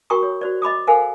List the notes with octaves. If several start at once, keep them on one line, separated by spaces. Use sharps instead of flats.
F#4 A#4 G5 A#5 C#6 D#6
C#5
F#4 C5 D5
D#5 B5 D6 D#6
A4 A#4 C5 F5 F#5 G#5